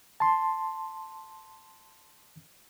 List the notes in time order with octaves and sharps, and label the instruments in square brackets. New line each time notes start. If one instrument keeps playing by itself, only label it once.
[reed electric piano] A5 C6